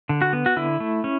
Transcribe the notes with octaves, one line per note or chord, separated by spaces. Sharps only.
D3
F#4
B3
F#4
D3 E4
A3
C#4